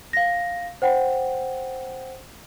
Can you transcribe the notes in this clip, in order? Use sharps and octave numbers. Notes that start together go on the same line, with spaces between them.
F5 A#6
C5 F#5 G5